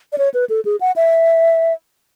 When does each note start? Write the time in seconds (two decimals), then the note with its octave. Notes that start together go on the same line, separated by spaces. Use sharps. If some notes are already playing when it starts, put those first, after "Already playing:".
0.13 D5
0.18 C#5
0.34 B4
0.49 A4
0.65 G#4
0.81 F#5
0.96 E5